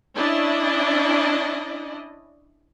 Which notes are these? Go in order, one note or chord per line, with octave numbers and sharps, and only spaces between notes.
C#4 D4 E4 D5 D#5